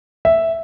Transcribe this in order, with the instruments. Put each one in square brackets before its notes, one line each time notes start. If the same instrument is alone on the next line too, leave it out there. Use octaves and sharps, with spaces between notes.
[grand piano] E5